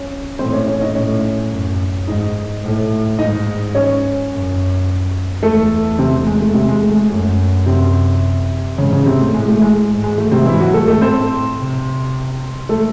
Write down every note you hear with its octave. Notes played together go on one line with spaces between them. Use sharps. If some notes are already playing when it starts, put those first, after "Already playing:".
Already playing: C#4
A2 C4 C5
C#4 C#5
C#4 C#5
D#4 D#5
A2 C#4 C#5
F#2
G#2 D#4 D#5
A2
G#2 D#4 D#5
C#4 C#5
F#2
E2 A3 A4
C3 C4
A3
G#3
A3
C3 C4
G#3
A3
G#3
F#2 A3
C3 C4
G#2 C#3 C#4
C#3 C#4
C3 C4
A3
A2 G#3
A3
G#3
G#2
G#3
A3
C3 C4
G#2 E3 E4
F#3 F#4
A3 A4
A3 A4
A2 C4 C5
C3
A3 A4